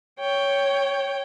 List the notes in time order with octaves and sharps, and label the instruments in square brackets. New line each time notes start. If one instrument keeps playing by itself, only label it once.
[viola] C#5 G5